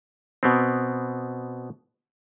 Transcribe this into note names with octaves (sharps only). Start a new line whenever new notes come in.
B2 B3 C4